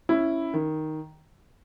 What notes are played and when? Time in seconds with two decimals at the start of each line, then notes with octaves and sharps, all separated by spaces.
0.09 C#4 E4
0.54 D#3